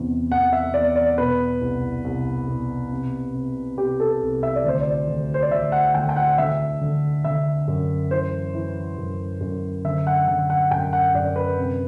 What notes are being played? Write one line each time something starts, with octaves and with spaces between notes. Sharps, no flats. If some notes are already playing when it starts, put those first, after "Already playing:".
Already playing: E2 C3
E2 F#5
E5
E2 D5
D5
B2 B4
C2
C2
B2
C3
C3
C3 G4
A4
C2
E5
D5
D2 C5
D5
D2
C5
D5
D2 E5
F#5
D2 G5
G5
F#5
D3 E5
D3
D3 E5
F#2
E3 C5
E3
F#2
F#2
D3 E5
F#5
D3 F#5
F#5
F#2 G5
F#5
F#2 D5
B4
C3